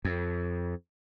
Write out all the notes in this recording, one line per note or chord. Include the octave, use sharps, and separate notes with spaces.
F2